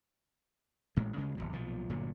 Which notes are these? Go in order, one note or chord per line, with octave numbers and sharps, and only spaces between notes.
A1 A2 G#3
D2 C#3 G#3
D1 A#1 E2 B2
B1 A#2 F3
G1 A#2 D3 F#3